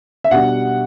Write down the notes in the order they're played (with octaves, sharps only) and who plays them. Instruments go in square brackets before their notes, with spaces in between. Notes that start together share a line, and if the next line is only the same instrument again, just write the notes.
[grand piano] E5
B2 G3 D4 F#5